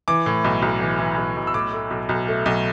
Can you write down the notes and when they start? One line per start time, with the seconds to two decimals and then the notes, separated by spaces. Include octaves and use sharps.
0.08 E3 D6
0.26 A2
0.44 B1
0.62 B1
0.81 E3
0.99 E3
1.17 B1
1.36 B1
1.47 E6
1.54 A2 D6
1.73 A3
1.90 B1
2.09 B1
2.28 A3
2.46 B1